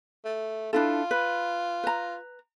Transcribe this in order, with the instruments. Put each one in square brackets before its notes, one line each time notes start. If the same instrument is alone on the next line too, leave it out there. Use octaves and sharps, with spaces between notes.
[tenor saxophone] A3
[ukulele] D4 E4 A4 [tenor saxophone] F4
[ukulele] B4
B4 A#5